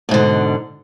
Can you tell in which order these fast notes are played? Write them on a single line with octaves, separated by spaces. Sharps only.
B2 G#2 D3